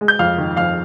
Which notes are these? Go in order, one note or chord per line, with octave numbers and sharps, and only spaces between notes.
G#3
G6
F2 F5 F6
D#3
F2 F5 F6